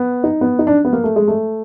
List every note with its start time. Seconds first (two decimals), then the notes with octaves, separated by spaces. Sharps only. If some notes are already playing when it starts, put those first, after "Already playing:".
Already playing: B3
0.24 D#4
0.41 B3
0.59 D#4
0.67 D4
0.85 B3
0.93 A#3
1.04 A3
1.16 G#3
1.28 A3